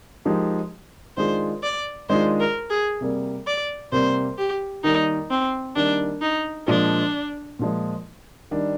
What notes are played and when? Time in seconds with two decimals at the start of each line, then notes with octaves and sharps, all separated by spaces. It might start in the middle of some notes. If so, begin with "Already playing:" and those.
0.25 F3 G#3 D#4 G4 A#4
1.17 D#3 G#3 D4 F4 G#4 C5
1.63 D5
2.09 D#3 G#3 D4 F4 G#4 C5
2.40 A#4
2.70 G#4
3.01 C3 G3 A#3
3.47 D5
3.92 C3 G3 A#3 C5
4.38 G4
4.84 D#3 G3 A#3 D#4
5.31 C4
5.76 D#3 G3 A#3 D4
6.21 D#4
6.67 A#2 F3 G#3 D4
7.59 A#2 F3 G#3
8.51 D#3 G3 D4